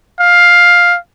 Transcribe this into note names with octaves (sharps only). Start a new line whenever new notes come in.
F5